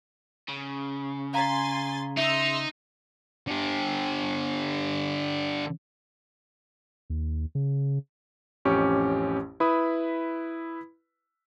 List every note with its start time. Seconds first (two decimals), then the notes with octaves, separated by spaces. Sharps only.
0.49 C#3
1.34 F5 G#5 A#5 C6 A6 B6
2.17 D#4 E5 C6 E6
3.47 D3 G4
7.10 D#2
7.55 C#3
8.65 A1 F2 C#4 G4 C#6 D6
9.60 E4 B4 B5 D#6